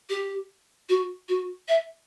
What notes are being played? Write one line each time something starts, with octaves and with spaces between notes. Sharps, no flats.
G4
F#4
F#4
E5